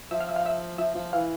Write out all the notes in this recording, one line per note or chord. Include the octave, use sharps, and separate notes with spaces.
F3 E5
F5
E5
F5
E5
F3 E5
F3
E3 F5